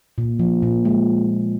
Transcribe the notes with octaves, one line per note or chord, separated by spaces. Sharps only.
A#2
F3
A#2
G#3